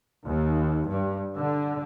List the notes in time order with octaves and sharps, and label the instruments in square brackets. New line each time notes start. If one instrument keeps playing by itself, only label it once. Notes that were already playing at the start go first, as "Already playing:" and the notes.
[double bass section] D#2
G2
D3